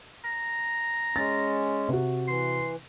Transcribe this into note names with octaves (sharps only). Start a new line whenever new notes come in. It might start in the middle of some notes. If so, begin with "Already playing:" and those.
A#5
G#3 C#4 A6
C3 F#4
E3 C6